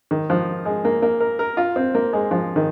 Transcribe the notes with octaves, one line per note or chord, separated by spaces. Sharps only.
D#3
F3
G#3
A#3
A#3
A#4
A#4
F4
C4
A#3
G#3
F3
D#3